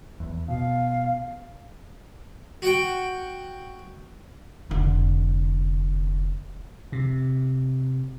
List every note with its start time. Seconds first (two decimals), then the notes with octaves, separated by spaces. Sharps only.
0.20 E2
0.48 B2 F5
2.62 F#4 F#5 G5
4.70 F1 D3
6.92 C3